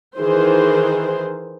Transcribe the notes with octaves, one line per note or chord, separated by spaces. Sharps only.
D#3 E3 G#4 C5